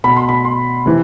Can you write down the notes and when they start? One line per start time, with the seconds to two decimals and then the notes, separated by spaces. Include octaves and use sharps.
0.04 B2 B5
0.16 C6
0.29 B5
0.45 C6
0.86 C3 E3